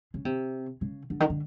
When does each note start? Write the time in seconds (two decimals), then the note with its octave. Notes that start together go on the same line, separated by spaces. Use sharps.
0.14 C#3
0.25 C3
0.81 C#3
1.10 D3
1.20 D#3
1.30 D3